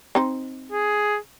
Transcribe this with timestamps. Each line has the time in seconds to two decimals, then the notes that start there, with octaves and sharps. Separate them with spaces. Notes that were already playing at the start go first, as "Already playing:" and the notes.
0.15 C4 D#4 C5
0.72 G#4